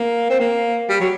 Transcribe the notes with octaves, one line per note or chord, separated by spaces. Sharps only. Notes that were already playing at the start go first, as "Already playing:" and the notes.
Already playing: A#3
C4
A#3
G3
F#3